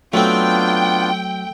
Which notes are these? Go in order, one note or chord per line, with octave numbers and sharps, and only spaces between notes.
F#3 A3 B3 C4 D4 F4 G5